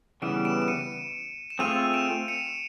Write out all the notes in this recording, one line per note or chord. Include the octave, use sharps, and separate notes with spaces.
C#3 E3 G3 B3 D7 E7
D7 E7
E7
C#7 D#7
E7
A3 C4 F4 G#4 D#7 F7
D7 E7
C#7 D#7